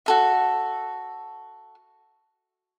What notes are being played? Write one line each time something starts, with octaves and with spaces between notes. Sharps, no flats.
F#4 A4 E5